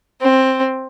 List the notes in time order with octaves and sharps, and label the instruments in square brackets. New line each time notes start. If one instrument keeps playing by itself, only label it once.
[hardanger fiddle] C4